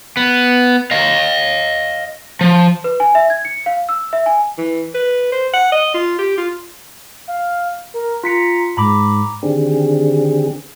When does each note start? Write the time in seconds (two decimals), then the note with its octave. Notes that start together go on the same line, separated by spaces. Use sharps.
0.17 B3
0.91 D#5 F5
2.41 F3
2.84 B4
3.00 G#5
3.15 E5
3.30 G#6
3.45 C#7
3.66 F5
3.89 E6
4.13 E5
4.26 G#5
4.58 E3
4.94 B4
5.32 C5
5.54 F#5
5.72 D#5
5.94 F4
6.18 G4
6.37 F4
7.28 F5
7.94 A#4
8.24 F4 A#5 B6 C#7
8.77 G#2 A#5 B5 D6
9.43 D3 D#3 C4 D4 G4 G#4